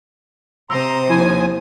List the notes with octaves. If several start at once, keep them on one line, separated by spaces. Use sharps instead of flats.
C3 C5 A#5 C6 D#6 E6
D#2 F3 E4 G#5 B5